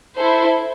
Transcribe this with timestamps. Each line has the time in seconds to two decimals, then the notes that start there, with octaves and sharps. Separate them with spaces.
0.17 E4 A4 C5